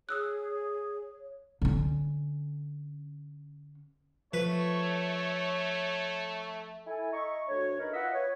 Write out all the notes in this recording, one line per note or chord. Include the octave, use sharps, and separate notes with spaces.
G#4 C#5 D#6 E6 F#6
D3 C#4
F3 A3 B4 C#5
E4 A4 G#5
D#5 E5 A#5 C#6
D2 D4 F#4 C#5
D#4 A#4 B4
F4 B4 D#5 E5 F#5
B4 C#5